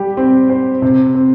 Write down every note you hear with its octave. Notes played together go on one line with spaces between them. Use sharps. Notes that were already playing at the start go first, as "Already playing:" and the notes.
Already playing: G3 G4
C4
C5
C3
C4